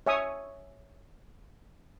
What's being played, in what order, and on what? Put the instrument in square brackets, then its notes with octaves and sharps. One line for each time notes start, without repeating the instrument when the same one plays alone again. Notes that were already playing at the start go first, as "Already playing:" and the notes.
[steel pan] C#5 E5 G#5 C#6 D#6